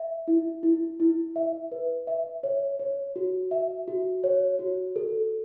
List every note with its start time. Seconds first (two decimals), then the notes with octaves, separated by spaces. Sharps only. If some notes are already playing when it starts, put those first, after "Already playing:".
Already playing: E5
0.28 E4
0.63 E4
1.00 E4
1.36 E5
1.72 B4
2.07 E5
2.43 C#5
2.79 C#5
3.16 F#4
3.51 E5
3.88 F#4
4.24 C#5
4.59 F#4
4.96 A4